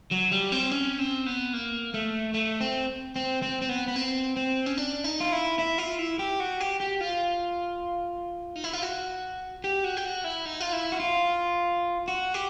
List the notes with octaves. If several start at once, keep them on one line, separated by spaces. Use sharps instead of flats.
F#3
G3
C4
C#4
C4
B3
A#3
A3
A3
C4
C4
C4
C4
B3
B3
C4
C4
C#4
D4
D#4
F4
E4
E4
F4
E4
G4
F#4
G4
G4
F4
D#4
E4
F4
F#4
G4
F#4
G4
F#4
E4
D#4
F4
E4
F#4
F4
F#4
G4